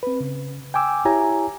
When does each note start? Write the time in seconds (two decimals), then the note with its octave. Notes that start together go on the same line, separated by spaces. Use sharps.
0.03 C4 B4
0.20 C#3
0.74 G5 G#5 D6 E6
1.05 E4 G4 C#5 G#5 A#5